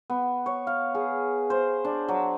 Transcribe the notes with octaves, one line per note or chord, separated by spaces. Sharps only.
B3
C#5
F5
G#4
C5
D4
F#3